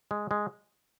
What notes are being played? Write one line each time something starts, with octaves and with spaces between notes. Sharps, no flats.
G#3
G#3